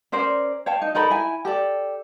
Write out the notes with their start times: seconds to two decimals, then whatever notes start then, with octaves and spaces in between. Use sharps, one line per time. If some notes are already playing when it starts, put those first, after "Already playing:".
0.12 C#4 A#4 C5 D5
0.66 C#5 F5 G5 A5
0.82 D#4
0.95 D#4 A4 A#4 B5
1.10 E4 G#5
1.45 G4 A4 D5